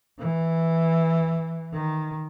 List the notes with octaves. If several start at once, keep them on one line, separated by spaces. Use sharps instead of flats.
E3
D#3